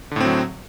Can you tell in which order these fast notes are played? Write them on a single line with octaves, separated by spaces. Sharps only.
D3 A2 C4 F#3